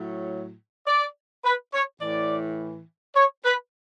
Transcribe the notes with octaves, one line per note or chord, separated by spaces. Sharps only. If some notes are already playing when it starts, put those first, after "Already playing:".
Already playing: A2 F#3
D5
B4
C#5
A2 E3 D5
C#5
B4